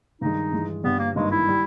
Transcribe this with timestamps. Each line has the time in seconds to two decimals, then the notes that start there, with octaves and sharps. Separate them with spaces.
0.21 G2 D#3 G#3 D#4
0.52 G2 E3 G#3
0.84 G1 G2 G3 B3
0.99 A#3
1.16 G#1 G2 D#3 G#3 A#3 D#4
1.31 E4
1.48 G3